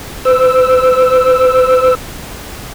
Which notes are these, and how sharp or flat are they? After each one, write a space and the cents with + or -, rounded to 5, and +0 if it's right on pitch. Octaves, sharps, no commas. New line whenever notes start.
C5 -45 E6 +0